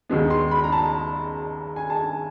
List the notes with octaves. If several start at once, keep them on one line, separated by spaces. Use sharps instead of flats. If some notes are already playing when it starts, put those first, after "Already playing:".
D#2 D#3 G#3 B3
C6
B5
A#5
A5
G#5
A5
G#5